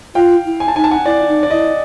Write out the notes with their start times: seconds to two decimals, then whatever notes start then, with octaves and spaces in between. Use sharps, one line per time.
0.15 F4 F5 G5
0.45 E4
0.60 G#5
0.68 A5
0.75 D#4 G#5
0.84 A5
0.91 F#5 G#5
1.05 E4 D5
1.28 D#4
1.43 D5
1.50 E4 D#5